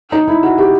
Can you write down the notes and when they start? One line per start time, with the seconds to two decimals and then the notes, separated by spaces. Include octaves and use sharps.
0.12 D#4
0.28 E4
0.43 F#4
0.58 G4